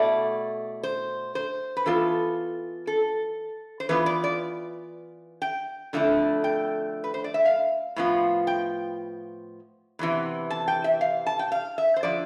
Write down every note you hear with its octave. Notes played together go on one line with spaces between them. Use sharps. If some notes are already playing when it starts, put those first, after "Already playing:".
Already playing: B2 A3 E4 D5
C5
C5
B4
E3 B3 F4 A4
A4
C5
E3 B3 F4 B4
D5
D5
G5
F2 D3 A3 E4
G5
B4
C5
D5
E5
F5
A2 F3 B3 F4
G5
E2 C3 E3
A5
G5
E5
F5
A5
G5
F5
E5
C5
D3 F3 D5